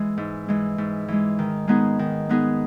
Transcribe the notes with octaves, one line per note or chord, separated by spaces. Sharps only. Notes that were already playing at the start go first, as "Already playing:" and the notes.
Already playing: E3 G#3
G#2
E3 G#3
G#2
E3 G#3
D#3
G#3 B3 D#4 G#4
D#3
G#3 B3 D#4 G#4